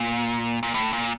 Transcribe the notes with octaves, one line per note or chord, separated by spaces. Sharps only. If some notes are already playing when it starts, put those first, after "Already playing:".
Already playing: A#2
A#2
A2
A#2